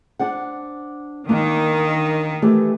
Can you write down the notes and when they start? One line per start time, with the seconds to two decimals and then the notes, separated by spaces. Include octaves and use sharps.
0.19 D4 C5 F#5
1.29 D#2 D#3 A#3 D4
2.42 E3 A3 G4